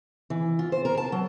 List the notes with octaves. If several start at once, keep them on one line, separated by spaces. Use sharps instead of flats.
E3
F4
C5
A#4
A5
F#3